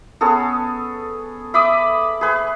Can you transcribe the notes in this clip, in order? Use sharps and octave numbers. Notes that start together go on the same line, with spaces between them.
B3 C#4 G#4 A4
E5 B5 D6 D#6
G#4 B4 G#5